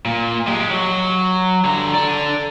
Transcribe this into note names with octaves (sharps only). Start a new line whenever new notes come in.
A#2
G#3 G4
F#3
D3 A#5
A4 D5